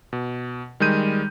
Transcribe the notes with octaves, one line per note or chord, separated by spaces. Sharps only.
B2
D#3 G3 G#3 G6 D#7